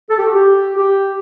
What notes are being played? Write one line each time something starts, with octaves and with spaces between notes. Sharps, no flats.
A4
G4
F#4
G4
G4